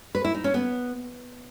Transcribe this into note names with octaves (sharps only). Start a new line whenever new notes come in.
B4
E4
D#4
C#4
B3